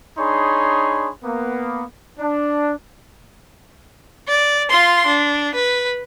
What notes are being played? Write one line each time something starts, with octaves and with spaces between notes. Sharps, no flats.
D4 D#4 G#4 C#5 B5 C6
A#3 B3
D4
D5
F4 C6
D4
B4